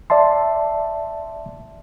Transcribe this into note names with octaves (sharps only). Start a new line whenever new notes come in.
D5 E5 A5 C6